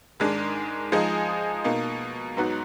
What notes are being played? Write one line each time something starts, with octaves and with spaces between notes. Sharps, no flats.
G#2 D#3 G#3 D4
F3 G#3 D#4 G#4 D#5
B2 A#3 D#4
G#2 F#3 B3 D#4 F#4